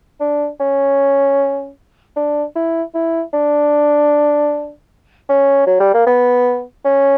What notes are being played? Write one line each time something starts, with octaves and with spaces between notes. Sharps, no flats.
D4
C#4
D4
E4
E4
D4
C#4
F#3
G3
A#3
B3
C#4